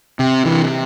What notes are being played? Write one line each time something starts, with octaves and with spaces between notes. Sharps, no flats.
C3
C3 E3